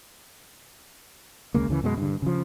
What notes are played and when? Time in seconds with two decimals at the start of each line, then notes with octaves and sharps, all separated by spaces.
1.54 D2 C#3 G#3 A#3
1.68 D2 C#3 E3
1.83 F#2 B2 F3 G#3
1.98 G2 D3
2.22 C#3 F3